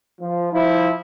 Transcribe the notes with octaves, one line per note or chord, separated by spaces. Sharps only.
F3
F3 E4